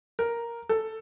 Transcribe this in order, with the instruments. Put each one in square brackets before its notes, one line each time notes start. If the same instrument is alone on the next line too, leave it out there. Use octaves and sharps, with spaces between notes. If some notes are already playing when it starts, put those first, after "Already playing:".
[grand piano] A#4
A4